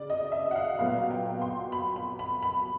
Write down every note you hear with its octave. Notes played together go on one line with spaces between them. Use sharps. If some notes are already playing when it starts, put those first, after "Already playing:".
Already playing: C#3 D5
D#5
E5
F#5
F5
A#2 F#3 B3 F5
G5
C6
B5
B5
B5
B5